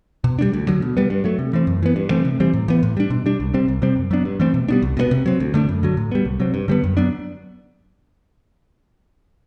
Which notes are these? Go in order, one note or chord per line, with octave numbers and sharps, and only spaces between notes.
B2
G3 B3 D4
D2
D3 F#3
B2
G3 B3
G2
F#3 A3
C3
E3 A3 C4
F#2
E3 B3
G2
E3 A3 C4
C3
E3 G3 C4
A2
E3 B3
A2
G3 D4
B2
G3 D4
C2
C3 G3 C4
C2
C3 G3 C4
F#2
F#3 B3 D4
G2
E3 A3 C4
B2
G3 B3 D4
C2
B2 G3 B3
C3
F#3 C4
D2
D3 A3 D4
F#2
D3 F#3
A2
G3 B3
C2
C3 F#3 C4
G2
D3 G3 B3
F#2
F#3 B3 D4